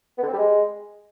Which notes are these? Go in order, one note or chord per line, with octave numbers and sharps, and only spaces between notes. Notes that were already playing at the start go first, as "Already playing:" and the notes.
B3
D3
C4
G3
G#3